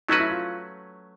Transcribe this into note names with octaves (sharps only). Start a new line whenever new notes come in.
F#3 A3 C#4 D#4 F#4 B4
E4
F4